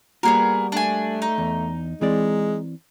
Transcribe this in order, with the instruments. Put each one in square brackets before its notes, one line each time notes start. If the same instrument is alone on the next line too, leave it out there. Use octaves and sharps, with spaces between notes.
[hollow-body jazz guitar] G3 A#3 F#4 [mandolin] B3 G#4 A#4
[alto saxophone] A3 [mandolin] D4 G#5
[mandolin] D#4
[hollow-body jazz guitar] E2
[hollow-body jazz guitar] E3 C4 D5 [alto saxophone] G#3